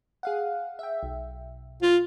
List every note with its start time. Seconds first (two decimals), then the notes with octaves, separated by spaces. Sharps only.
0.23 G#4 F5 F#5
0.79 E5 G5
1.03 B1
1.82 F4